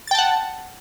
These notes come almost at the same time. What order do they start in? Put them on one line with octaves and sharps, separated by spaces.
A6 G5 A5 F#5